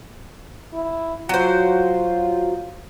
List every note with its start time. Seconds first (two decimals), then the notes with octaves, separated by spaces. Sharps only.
0.73 E4
1.29 F#3 F4 C5